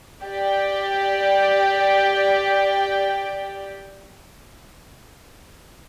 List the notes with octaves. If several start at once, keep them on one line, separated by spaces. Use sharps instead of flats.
G4 D5 G5